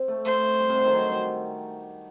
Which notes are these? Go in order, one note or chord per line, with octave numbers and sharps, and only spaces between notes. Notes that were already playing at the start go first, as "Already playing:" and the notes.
Already playing: C4
A3
A3 C5
G3
C3
D3
D#3
F#3
G3